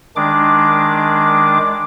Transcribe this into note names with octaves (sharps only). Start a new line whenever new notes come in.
D#3 G#3 D4 D6